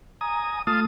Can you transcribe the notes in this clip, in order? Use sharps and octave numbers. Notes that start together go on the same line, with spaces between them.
G#5 A#5 D#6
A3 F4 A5 D#6